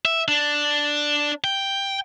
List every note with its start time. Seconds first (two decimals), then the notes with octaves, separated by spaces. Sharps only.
0.05 E5
0.28 D4
1.44 G5